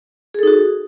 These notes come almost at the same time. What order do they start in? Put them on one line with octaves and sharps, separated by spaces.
G#4 A4 D#4 F#4